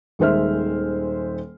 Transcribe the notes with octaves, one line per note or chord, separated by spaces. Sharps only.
D#1 D#3 G#3 C5 E5 F6